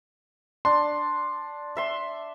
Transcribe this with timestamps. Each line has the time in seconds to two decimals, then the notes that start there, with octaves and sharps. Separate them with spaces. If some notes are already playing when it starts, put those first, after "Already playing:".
0.65 D4 C6
1.77 E5 C6